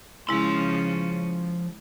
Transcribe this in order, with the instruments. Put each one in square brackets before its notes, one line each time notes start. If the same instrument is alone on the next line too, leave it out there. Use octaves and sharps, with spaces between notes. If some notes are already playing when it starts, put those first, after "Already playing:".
[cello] C#3 C#4 [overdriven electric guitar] F3 C6 [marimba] G#3 E4